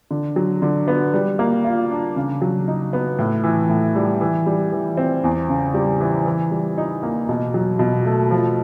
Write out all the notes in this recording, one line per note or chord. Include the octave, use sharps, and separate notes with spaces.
D3
F#3
D3
B3
G3
A#3
F4
D4
C#3
F#3
D#4
B3
A2
E3
A2
G3
E3
G3
E3
C4
E2
C#3
G3
E3
E3
G3
D#4
A#3
B2
F#3
B2
A3
F3